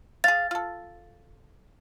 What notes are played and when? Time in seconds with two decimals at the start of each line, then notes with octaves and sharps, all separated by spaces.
0.24 G#4 F5 A6
0.51 F4 A4